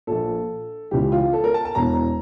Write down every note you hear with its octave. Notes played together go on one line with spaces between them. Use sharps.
A#1 A#2 A4
C#2 C#3 E3 G4
F4
A4
A#4
A5
A5
E1 E2 E3 A#5